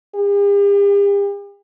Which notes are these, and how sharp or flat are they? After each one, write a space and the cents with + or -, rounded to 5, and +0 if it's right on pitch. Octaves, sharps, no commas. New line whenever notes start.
G4 +45